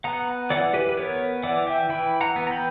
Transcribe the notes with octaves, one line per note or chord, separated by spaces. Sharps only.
B3 F#5 A#5
E3 D5 F#5
G4 B4
B4
B3 A#4 C#5
E3 D5 F#5
E5 G5
E3 G5 B5
F#5 A#5
B3
A#5
G5 B5